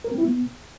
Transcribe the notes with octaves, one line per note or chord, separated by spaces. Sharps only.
A#4
C4
E4
B3